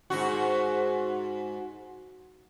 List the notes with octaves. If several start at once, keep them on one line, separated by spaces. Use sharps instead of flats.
G#2 C3 F#4